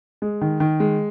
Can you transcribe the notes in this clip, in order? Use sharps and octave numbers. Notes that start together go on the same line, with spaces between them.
G#3
D#3
D#3
G#3